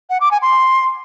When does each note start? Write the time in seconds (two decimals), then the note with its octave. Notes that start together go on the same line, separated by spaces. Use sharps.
0.10 F#5
0.20 D6
0.31 G#5
0.42 C6